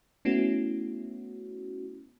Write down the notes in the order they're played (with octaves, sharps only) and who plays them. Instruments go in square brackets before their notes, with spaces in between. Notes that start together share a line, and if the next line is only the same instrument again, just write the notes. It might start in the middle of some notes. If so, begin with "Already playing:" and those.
[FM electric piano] A3 B3 C#4 E4 F#4